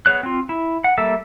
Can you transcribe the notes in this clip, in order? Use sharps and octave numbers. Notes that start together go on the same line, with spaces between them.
B3 G#4 C#5 F#6
C4 F4
E4
F#5
G3 A#3 A4 E5